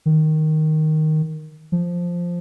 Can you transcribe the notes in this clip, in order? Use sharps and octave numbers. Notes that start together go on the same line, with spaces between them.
D#3
F3